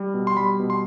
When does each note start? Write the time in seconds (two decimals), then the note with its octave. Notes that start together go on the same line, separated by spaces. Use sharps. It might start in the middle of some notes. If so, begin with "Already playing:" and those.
Already playing: G3
0.14 B2
0.27 C6
0.37 G3 B5
0.59 B2
0.70 C6